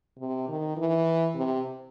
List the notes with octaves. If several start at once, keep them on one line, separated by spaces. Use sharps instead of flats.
C3
D#3
E3
C3